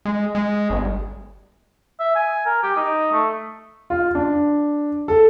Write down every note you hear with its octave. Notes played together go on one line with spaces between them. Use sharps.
G#3
G#3
G1
E5
G#5
A#4
G4
D#4
A3
F4
D4
A4